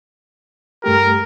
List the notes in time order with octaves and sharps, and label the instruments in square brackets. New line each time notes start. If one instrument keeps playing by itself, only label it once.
[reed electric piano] G2 A3 G4 [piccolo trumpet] A#4